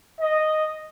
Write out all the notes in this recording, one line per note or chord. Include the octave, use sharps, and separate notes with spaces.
D#5